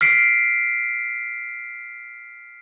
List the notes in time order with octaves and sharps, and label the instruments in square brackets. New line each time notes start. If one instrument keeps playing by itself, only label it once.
[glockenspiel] F6 B6 C7 D7